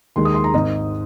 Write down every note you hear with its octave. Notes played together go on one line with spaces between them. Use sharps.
D#2 D#3 G#3 C6
D#6
C6
A#5
G#1 G#2 G#3 D#5